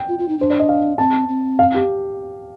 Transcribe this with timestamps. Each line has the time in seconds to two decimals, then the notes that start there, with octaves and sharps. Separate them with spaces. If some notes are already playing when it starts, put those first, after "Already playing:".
Already playing: G5
0.08 F4
0.19 F4
0.28 D#4
0.39 D4 C5
0.50 D5
0.60 D#5
0.69 F5
0.98 C4 A5
1.29 C4
1.59 F5
1.74 G4